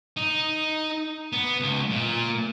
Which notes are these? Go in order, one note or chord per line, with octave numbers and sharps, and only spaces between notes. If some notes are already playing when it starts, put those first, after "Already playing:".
D#4
B3
C#2
A#2